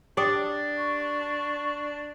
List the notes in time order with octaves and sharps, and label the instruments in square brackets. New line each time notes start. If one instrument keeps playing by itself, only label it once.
[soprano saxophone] D4 [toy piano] G4 G5 D#6 [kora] D5
[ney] C#6